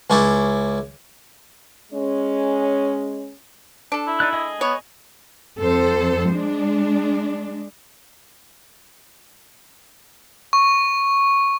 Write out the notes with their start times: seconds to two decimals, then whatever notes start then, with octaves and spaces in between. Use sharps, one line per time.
0.10 C#2 C#4 E4 D5
1.93 G#3 C#4
3.92 D4 A4
4.07 E4
4.20 D#4 D5 F#6
4.33 G#4 D#5 D#6
4.61 B3 C#5
5.58 F2 A4 C5
6.30 G#3 D4
10.53 C#6